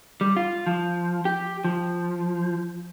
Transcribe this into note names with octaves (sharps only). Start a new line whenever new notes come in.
G3
F4
F3
G4
F3